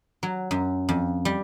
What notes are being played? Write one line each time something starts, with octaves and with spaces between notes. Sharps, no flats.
F#3
F#2
F2
G3